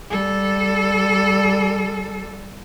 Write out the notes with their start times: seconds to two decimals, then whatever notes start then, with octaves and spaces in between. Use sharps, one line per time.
0.11 G3 A4